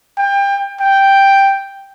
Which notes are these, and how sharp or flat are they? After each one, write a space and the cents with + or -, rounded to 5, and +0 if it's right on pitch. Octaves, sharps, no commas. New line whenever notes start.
G5 +25
G5 +0